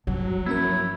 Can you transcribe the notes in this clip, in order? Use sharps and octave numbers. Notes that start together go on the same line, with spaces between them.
G2 F3 F#3
A#3 C#4 E4 A#4